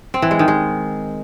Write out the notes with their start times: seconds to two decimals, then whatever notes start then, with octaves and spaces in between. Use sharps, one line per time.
0.14 C4
0.22 E3
0.31 G#3
0.39 D#3
0.48 G#3